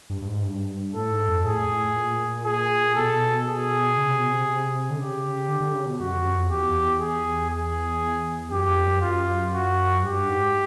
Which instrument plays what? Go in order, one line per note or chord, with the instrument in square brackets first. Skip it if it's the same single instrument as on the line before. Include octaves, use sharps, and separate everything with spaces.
[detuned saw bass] G2
G2
G#2
G2
[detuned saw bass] A2 [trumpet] A4
[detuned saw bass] G#2
F2
[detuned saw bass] A2 [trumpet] G#4
[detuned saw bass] A2
A#2
[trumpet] G#4
[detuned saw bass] B2 [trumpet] A4
[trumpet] G#4
[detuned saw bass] C#3
C3
B2
C3
D3
[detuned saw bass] C#3 [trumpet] G4
[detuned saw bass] D3
D3
C#3
B2
[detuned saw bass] F#2 [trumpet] F#4
[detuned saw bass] F2
F#2
F2
[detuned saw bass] E2 [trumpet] G4
[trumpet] G#4
G#4
[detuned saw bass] F#2 [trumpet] G4
[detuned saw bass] F2
F#2
[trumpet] F4
F#4
[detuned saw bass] G2 [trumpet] G4
[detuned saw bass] G#2